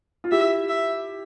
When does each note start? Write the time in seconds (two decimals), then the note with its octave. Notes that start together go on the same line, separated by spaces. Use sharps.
0.24 F4
0.31 E4 G4 E5
0.69 E5